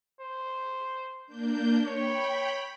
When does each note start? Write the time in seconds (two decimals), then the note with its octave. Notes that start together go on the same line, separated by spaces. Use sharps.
0.20 C5
1.26 A#3 D4 G6
1.86 C#5 G5 B5